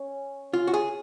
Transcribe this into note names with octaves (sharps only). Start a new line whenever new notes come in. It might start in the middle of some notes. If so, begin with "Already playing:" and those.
Already playing: C#4
F4
F#4
G#4